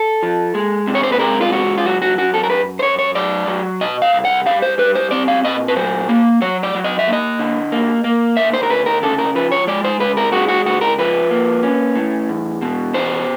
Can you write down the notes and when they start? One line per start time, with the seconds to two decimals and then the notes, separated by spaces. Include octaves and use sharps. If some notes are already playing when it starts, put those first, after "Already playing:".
Already playing: A4
0.23 F3
0.55 G#3
0.87 C3
0.95 C#5
1.03 C5
1.12 B4
1.19 G#3 A#4
1.41 F4
1.52 C#2 F#4
1.78 F4
1.85 F#3 F#4
2.02 F#4
2.18 F#2 F#4
2.34 A4
2.43 A#4
2.50 F#2 B4
2.79 C5
2.83 F#2 C#5
2.99 C#5
3.15 F#3 D5
3.48 F#3
3.81 B2 D#5
4.02 F5
4.13 C2
4.25 F#5
4.46 G3 F5
4.62 C5
4.78 G3 B4
4.95 C5
5.11 C4 D5
5.28 F5
5.44 A#2 D#5
5.68 B4
5.76 F#3 C5
6.09 A#3
6.42 F#3 C#5
6.63 D5
6.75 F#3
6.84 D#5
6.99 E5
7.07 A#3
7.13 D#5
7.39 D3
7.72 A#3
8.04 A#3
8.37 D2 E5
8.54 C5
8.63 A#4
8.70 D2 B4
8.86 A#4
9.02 C#3 A4
9.18 A#4
9.35 F3 B4
9.52 C#5
9.67 G#3 D5
9.85 C5
9.99 C#2 B4
10.17 A#4
10.32 G#3 F#4
10.49 F#4
10.66 C#2 F#4
10.81 A#4
10.99 F3 B4
11.31 A#3
11.63 C#4
11.96 A2
12.29 E2
12.62 B2
12.94 E2 C5